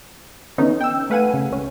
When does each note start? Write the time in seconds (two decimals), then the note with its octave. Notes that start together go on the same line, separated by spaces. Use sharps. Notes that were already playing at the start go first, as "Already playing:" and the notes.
0.58 D3 E3 B3 C#4 D#4
0.81 G5 E6
1.10 A3 B4 F5 F#5 G#5 D#7
1.34 C#3
1.51 C#2 C#4